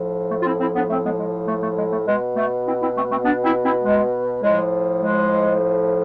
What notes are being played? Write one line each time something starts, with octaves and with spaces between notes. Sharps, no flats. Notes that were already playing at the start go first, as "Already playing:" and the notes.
Already playing: A2 F3
A3
F4
C4 E4
C4 E4
B3 D4
A3 C4
G#3 B3
G#3
A3
A3
G#3
A3
B2 G#3
A3
C4 E4
C4 E4
A3 C4
A3 C4
B3 D4
C4 E4
C4 E4
G#3
A2 F3 G#3
G#3